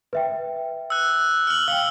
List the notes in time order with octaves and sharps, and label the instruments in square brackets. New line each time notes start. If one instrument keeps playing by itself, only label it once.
[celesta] B4 E5 G5
[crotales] E6 F#6
F6 F#7
[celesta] F5 G5 [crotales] E6